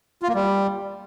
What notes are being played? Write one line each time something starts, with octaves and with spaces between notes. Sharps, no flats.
F4
A#3
G3